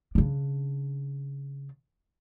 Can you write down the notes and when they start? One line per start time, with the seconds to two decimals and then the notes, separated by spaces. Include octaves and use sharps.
0.15 C#3 D4